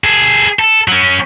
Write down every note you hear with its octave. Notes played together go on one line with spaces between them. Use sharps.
G#4 A4
A4
F#3 C#4